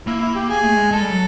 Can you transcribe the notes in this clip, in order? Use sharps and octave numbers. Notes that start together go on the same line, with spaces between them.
A#3 E4
E4
G4
G#4
A3
G#3
G#3 A4
G3
F#3